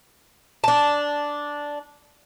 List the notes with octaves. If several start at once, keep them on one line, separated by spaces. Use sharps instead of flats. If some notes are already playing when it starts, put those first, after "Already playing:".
D4 A5